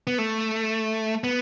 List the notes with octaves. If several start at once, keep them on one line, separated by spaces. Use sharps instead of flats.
B3
A3
B3